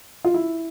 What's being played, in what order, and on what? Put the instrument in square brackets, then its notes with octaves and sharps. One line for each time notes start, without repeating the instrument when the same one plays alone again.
[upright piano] F4
E4